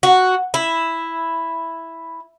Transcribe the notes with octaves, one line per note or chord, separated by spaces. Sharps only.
F#4
E4